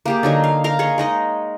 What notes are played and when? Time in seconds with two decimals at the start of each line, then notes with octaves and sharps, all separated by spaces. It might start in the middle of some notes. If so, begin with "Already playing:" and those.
0.06 A#3 G4 G#4
0.23 D3 F#3 D#4 G#5
0.44 F5
0.64 A#4 F5 A#5
0.79 G#4 C#5 D#5
0.98 G#3 D#4 D#5